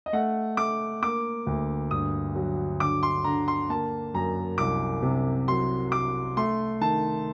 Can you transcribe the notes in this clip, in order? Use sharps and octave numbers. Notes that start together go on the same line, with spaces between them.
D#5
A3 F#5
A3 D6
A#3 D6
D2
G2 D#6
F#3
D3 D6
C6
D3 A#5
C6
A#3 A5
F#2 A#5
C2 D6
C3
F#3 C6
F#3 D6
A3 C6
D#3 A5